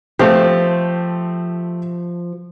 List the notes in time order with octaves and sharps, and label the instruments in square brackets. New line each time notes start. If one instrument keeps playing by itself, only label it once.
[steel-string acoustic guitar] F3 [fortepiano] A3 C4 G4